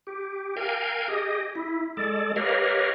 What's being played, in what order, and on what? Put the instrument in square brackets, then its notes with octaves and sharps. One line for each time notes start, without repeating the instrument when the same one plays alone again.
[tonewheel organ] G4
A#4 F5 G5 G#5
G4 G#4 D#5
E4
G#3 A4 D5
G4 A#4 B4 C#5 D#5 F5